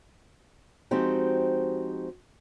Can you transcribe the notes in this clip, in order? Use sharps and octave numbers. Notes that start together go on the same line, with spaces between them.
F3 G#3 C4 D#4 F#4 G4